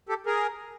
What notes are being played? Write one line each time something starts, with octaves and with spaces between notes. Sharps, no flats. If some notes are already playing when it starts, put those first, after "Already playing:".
G4 A4
G#4 A#4